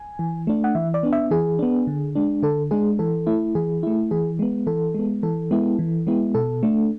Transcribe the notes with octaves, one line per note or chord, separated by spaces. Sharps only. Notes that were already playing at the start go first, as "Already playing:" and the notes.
Already playing: G#5
E3
A3 D4
F#5
E3 E5
D5
B3 D4
E5
E3 G#4
B3 D4
D3
G#3 D4
D3 A4
G#3 D4 G#4
E3 A4
A3 E4
E3 G#4
A3 E4
E3 G#4
G#3 B3
E3 A4
G#3 B3
E3 A4
G#3 B3 E4
E3
G#3 B3 E4
B2 A4
A3 D4